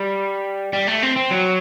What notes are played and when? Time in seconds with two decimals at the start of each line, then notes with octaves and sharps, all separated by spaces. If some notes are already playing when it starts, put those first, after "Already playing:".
Already playing: G3
0.73 G3
0.88 A3
1.03 C4
1.16 C4
1.31 F#3